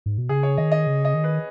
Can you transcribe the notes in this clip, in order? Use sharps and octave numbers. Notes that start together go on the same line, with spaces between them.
G#2
B2
C#3 G#4
C#5
D#3 D#5
D#5
C#3
D#5
D#3
B4